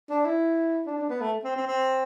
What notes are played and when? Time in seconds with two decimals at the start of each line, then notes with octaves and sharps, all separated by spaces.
0.10 D4
0.25 E4
0.86 D4
0.98 D4
1.10 B3
1.21 A3
1.44 C4
1.56 C4
1.67 C4